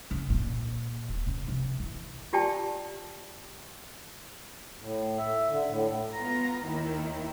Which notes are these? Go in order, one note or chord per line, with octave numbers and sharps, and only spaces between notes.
C#3
A#2
D#1
C#3
C3
E3
F4 G4 D5 G5 A5
A2
E5
D3
A2
B3 F4 A#5
D#2 D#3 E4